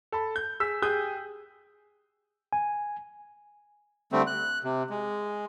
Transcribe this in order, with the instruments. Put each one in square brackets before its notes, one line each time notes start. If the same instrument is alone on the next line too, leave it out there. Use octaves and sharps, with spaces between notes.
[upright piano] A4 A5 B5
G6
G#4 E6 B6
G4 G#4 G5 D#6 F#6 G6
[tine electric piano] G#5
[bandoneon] D3 G3 A3 C4
F#6
C3
G#3